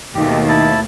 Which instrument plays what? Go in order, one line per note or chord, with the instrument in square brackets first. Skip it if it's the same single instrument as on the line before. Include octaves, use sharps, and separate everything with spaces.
[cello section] D#2 B2 A3 [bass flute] D#3 [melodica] G4
[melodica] E4 A5